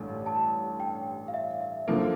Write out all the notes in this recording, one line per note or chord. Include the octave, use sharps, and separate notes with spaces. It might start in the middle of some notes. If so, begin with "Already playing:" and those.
Already playing: A1 G2 D3 D4
A5
G5
F5
E5
E5
D3 F3 A#3